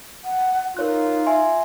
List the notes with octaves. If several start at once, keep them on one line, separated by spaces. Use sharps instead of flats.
F#5
D#4 F4 A#4 C#5 F#6
E5 G#5 C6